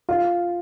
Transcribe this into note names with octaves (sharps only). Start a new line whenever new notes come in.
F4